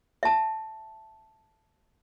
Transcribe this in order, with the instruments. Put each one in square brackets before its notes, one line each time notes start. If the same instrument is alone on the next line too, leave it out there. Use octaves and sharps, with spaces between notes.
[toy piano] E5 A5